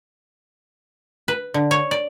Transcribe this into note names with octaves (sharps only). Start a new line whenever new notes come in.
B4
D3
C#5
D5